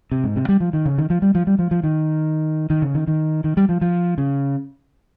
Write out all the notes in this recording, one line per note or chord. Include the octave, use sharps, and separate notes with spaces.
C3
G#2
C3
G3
F3
D#3
C#3
D#3
F3
G3
F3
G3
F3
F3
D#3
D#3
C#3
D#3
D#3
D#3
G3
F3
F3
C#3